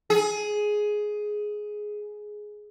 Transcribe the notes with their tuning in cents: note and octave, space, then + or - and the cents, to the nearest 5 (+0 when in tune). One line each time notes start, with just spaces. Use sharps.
G#4 +10